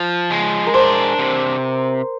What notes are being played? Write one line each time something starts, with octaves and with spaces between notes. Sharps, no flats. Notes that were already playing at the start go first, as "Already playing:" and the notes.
Already playing: F3
G#3
A#4
D4 C5
C3